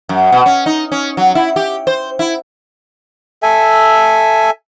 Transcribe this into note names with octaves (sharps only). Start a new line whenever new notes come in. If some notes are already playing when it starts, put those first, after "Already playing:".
F#2
B2
C#4
D#4
C#4
F#3
E4
G4
C5
E4
A4 E5 G#5